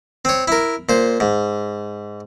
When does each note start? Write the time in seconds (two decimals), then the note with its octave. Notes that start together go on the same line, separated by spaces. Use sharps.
0.25 C4 C#5
0.48 E4 A#4
0.89 A#2 C5
1.20 G#2